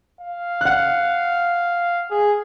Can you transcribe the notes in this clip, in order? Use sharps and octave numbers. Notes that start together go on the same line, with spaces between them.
F5
F#5 F#6
G#4